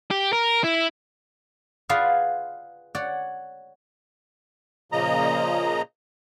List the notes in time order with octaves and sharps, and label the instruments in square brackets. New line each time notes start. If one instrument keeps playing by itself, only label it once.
[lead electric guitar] G4
A#4
E4
[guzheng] F4 G#4 B4 D5 F5 F#5
C#5 D5 F#5
[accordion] A#2 C#3 F3 A#3 D#5 A#5